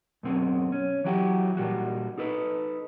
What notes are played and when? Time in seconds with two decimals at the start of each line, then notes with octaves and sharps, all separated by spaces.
0.23 F#2 B2 C4
0.72 C#4
1.04 E3 F#3 F#4 G4
1.57 A#2 G3 F#4
2.18 D#4 A4 B4